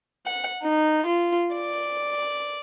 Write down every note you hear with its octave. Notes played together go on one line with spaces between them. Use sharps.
F#5
D#4
F4
D5